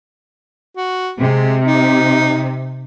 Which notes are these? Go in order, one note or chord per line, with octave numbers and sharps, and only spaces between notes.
F#4
C3 G#3
D#4